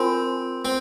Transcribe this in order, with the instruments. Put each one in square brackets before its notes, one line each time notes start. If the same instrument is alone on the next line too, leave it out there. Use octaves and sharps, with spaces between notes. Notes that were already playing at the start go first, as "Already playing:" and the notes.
Already playing: [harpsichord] C4 [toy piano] F4 A#4 G#5 C6
[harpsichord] C4